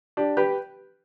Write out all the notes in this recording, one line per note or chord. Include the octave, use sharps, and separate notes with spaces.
D4 G4
G4 B4